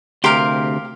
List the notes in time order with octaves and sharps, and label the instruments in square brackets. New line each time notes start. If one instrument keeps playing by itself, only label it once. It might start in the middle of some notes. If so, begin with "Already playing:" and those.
[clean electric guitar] D2 C3 C6 [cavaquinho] G4 A#4 F5